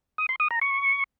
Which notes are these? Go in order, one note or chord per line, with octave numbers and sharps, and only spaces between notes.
D#6
C6
D#6
A#5
C#6